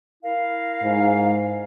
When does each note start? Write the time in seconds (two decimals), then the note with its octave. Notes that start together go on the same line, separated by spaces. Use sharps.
0.24 E4 A#4 F5
0.83 G#2